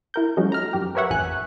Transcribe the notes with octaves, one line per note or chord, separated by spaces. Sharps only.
E4 A#4 G6
F3 G3 A3 C#4 D#4 F#4
A#5 F6
F#2 G4
A#4 B4 C#5 E5 F#5
A1 F2 G#5 F#6